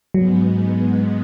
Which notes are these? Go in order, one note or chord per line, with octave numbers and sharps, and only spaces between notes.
G#2 F#3 G#3 B3